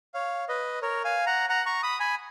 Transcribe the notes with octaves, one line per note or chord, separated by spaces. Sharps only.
C#5 F5
B4 D#5
A#4 C#5
F5 G#5
F#5 A#5
F#5 A#5
A#5 C#6
B5 D#6
G#5 B5